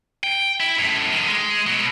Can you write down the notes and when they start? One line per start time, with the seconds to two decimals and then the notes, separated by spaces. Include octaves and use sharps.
0.24 G5
0.60 E4
0.79 F#2 A2
1.13 D3 D#3
1.28 G#3
1.67 B2 F#3